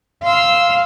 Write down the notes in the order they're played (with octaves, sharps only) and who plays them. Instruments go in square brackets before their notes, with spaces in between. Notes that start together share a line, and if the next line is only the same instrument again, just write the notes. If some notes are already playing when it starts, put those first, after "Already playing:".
[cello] F5 [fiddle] C6 E6